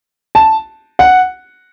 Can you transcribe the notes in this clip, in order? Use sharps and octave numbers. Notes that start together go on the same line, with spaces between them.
A5
F#5